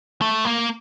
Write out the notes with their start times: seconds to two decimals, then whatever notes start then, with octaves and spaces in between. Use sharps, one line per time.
0.22 A3
0.45 A#3